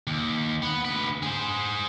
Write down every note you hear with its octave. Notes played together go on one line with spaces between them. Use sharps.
D#2
B3
D2 B4
G#4 C5